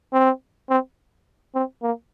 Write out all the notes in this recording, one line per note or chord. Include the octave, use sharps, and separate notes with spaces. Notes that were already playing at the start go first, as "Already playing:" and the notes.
C4
C4
C4
A#3